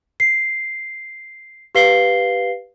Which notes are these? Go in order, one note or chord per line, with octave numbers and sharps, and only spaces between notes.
C7
G4 B4 F5 C7 G7